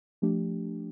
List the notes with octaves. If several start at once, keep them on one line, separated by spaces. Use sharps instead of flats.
F3 A3 D4 G4